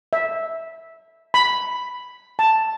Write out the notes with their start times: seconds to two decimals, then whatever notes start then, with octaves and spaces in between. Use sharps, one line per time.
0.13 E5
1.34 B5
2.39 A5